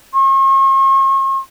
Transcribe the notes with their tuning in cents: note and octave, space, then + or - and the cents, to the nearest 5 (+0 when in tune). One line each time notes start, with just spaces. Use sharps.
C#6 -45